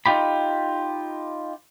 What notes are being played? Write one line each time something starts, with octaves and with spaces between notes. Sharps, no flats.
D#4 F4 G4 B5